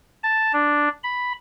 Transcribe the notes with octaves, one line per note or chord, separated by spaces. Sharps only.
A5
D4
B5